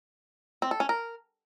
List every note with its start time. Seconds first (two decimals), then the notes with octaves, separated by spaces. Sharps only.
0.62 C4
0.71 A4
0.80 C#4
0.89 A#4